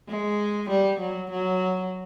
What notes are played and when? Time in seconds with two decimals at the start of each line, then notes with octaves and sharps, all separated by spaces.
0.09 G#3
0.70 G3
1.00 F#3
1.31 F#3